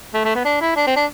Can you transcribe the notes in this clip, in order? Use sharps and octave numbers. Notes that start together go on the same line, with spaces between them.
A3
A3
B3
D4
E4
D4
C4
D4